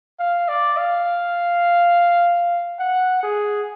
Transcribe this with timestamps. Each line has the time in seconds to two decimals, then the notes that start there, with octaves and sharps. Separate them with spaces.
0.19 F5
0.49 D5
0.78 F5
2.79 F#5
3.23 G#4